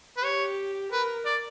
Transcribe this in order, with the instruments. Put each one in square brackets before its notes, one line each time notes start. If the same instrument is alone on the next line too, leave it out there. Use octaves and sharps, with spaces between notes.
[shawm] B4
[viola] G4 [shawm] C#5
[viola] A#4 [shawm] B4
[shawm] D5